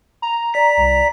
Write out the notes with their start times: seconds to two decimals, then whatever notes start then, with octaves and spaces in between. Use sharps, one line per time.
0.22 A#5
0.54 D5 B6
0.77 C2